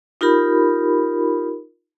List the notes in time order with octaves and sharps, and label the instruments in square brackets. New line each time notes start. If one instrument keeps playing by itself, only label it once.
[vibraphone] D#4 F4 G4 A#4 B5